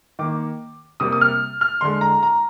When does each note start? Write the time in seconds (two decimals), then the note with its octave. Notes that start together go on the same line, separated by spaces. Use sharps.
0.19 D#3 A#3 D6
1.00 C3 G3 A#3 D#6
1.12 D#6
1.21 F6
1.61 F6
1.81 D3 G#3 C6
2.01 A#5
2.23 A#5